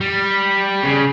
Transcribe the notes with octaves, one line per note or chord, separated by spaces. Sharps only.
G3
C#3